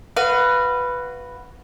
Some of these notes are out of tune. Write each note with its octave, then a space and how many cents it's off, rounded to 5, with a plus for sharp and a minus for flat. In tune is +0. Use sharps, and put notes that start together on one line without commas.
F#4 +0 B4 +0 F5 -25